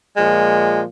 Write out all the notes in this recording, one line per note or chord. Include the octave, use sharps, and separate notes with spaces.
A#2 F3 G#3